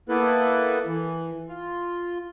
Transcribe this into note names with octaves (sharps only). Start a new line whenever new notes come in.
A#3 B3 E4 A4 B4
E3
F4